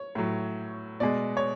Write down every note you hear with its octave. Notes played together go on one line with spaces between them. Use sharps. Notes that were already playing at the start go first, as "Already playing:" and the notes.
Already playing: C#5
A2 F#3
B2 G#3 D5
C#5